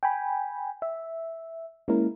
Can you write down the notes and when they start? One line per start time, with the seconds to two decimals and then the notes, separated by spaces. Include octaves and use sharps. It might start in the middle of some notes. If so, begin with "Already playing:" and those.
0.03 G5 G#5 B5
0.82 E5
1.88 G#3 A#3 C#4 E4 A#4